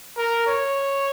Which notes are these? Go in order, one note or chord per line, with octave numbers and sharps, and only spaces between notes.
A#4
C#5